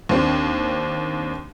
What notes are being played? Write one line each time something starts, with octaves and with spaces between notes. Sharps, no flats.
D#2 C4 D4